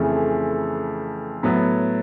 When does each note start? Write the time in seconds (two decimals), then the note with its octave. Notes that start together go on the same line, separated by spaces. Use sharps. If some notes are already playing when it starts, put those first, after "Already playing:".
Already playing: F2 C#3 E3 A3
1.43 A2 F#3 B3